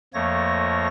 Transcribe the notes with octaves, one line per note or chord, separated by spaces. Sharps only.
F2 F3 A3 A#3 C#5 A#6